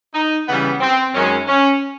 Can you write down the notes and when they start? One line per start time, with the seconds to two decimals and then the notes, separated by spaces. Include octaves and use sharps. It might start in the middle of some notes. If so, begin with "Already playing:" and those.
0.14 D#4
0.47 C#3 E3 G3 B3
0.81 C4
1.14 F#2 D#3 G#3 C#4
1.48 C#4